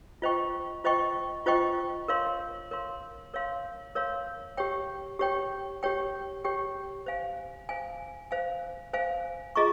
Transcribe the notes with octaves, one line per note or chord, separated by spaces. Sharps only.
F4 C5 D#5 G5 C#6
F4 C5 D#5 G5 C#6
F4 C5 D#5 G5 C#6
A#4 C#5 F5 C6
A#4 C#5 F5 C6
A#4 C#5 F5 C6
A#4 C#5 F5 C6
G4 C#5 G5
G4 C#5 G5
G4 C#5 G5
G4 C#5 G5
C5 F5 G#5
C5 F5 G#5
C5 F5 G#5
C5 F5 G#5
F4 G#4 D#5 A#5 C#6